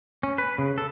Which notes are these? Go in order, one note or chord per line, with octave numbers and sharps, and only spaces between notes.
C#4
B4
C#3
A4